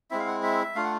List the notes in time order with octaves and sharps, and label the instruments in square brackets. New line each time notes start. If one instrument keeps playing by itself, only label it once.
[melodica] G#3 C4 E4 E5
F5
F#5
E5
A3 D4 F4 F5
F#5